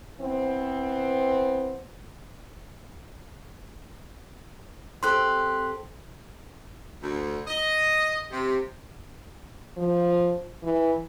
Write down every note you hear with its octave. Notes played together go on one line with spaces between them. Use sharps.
E3 B3 C4
C4 G4 A4 C6 F#6
D2
D#5
C3
F3
E3